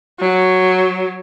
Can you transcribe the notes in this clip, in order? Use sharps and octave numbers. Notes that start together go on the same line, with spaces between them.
F#3